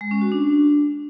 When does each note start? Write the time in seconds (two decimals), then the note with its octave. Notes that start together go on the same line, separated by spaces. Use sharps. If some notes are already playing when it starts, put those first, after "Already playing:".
0.01 G#3
0.11 C#4
0.21 F#4
0.32 D4